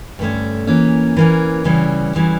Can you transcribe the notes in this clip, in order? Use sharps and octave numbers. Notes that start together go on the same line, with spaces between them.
G2 D3 A3 C#4
E3 A#3 C#4
E3 A#3 C#4
D2 C#3 E3 G3 C#4
D2 C#3 E3 G3 C#4